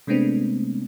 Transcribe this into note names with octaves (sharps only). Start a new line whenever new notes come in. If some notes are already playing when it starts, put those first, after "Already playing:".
C3 G#3 A3 B3 C4 D4